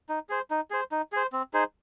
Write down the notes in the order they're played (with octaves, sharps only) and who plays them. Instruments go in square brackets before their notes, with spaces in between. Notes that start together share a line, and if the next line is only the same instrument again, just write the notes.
[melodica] D#4
G#4 C5
D#4
G#4 C5
D#4
G#4 C5
C4
D#4 G#4 C5